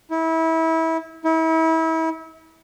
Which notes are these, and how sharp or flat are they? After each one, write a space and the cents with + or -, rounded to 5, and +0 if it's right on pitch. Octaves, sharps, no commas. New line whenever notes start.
E4 -25
E4 -35